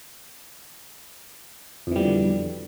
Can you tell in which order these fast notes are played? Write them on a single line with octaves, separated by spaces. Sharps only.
F2 E3 G3 B2 D3